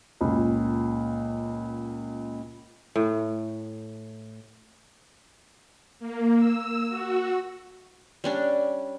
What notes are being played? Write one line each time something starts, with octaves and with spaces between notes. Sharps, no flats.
C#2 A#2
A2
A#3
E6
F#4
G3 C#4 D4